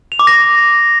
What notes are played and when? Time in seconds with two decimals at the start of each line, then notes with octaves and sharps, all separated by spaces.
0.12 F7
0.19 D6
0.27 A#6